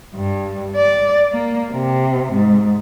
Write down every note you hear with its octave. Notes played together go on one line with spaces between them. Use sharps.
G2
D5
A#3
C3
G#2